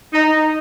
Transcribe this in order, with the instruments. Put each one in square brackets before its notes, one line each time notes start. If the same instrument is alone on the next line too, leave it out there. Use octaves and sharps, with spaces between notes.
[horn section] D#4